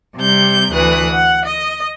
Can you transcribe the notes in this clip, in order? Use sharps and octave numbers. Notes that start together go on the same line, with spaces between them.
C3 G3 G6
D2 E3 B4 D#6 F#6
F#5
D#5